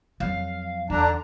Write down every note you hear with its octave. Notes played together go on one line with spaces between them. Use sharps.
F2 F#3 F5
E2 D3 D4 A#5